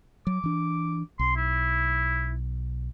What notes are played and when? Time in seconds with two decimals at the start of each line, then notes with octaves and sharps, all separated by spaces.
0.27 F#3 D6
0.44 E3 D4
1.19 B1 C6
1.36 E4